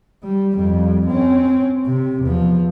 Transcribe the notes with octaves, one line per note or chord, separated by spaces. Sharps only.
G3
F2 G3
C4 C#4
C3
E2 F3